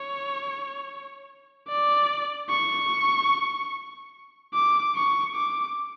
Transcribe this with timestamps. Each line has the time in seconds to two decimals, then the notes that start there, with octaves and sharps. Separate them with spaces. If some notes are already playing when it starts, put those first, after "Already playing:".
Already playing: C#5
1.68 D5
2.50 C#6
4.54 D6
4.96 C#6
5.36 D6